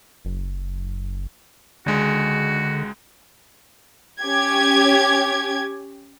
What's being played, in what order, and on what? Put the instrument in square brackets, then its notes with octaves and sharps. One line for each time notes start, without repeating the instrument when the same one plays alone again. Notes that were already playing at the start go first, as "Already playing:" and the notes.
[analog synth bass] F#1
[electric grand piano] C#2 G#3 [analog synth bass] D3 [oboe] F#4
[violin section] C#4 G4 G#6